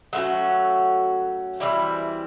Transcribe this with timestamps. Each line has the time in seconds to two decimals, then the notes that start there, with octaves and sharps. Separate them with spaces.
0.13 F#3 A3 C#4 F#4
1.60 E3 G3 C4 E4